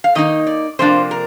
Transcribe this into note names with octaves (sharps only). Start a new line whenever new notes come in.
F5
D#3 A#3 D#4 D#5
D5
C3 F3 A#3 D4 C5
A#4